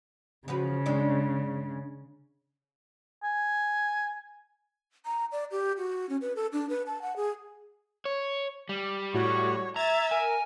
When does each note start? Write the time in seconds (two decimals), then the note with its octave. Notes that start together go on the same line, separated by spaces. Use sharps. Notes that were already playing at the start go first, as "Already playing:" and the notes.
0.48 C#3 F3 F#4 B4
0.86 G2 G#3 D4
3.24 G#5
5.05 A#5
5.32 D5
5.51 G4
5.78 F#4
6.09 C#4
6.21 B4
6.36 A4
6.53 D4
6.69 B4
6.86 A5
7.02 F#5
7.16 G#4
8.05 C#5
8.69 G3
9.14 A2 F#4 C#5
9.76 E5 A#5 G#6 A6
10.11 A#4 G#5